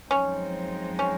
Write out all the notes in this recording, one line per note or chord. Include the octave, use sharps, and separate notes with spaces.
F#2 F3 G#3 C4 C#4 D#4
C#4